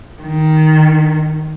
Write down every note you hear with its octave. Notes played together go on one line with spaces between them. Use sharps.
D#3